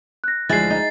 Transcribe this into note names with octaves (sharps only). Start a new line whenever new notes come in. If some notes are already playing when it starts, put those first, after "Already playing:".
F#6 A#6
D2 F3 G#3 E4 G#4 A6 C7
D#4